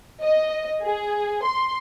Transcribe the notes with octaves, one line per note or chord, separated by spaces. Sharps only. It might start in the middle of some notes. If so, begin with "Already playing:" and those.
D#5
G#4
C6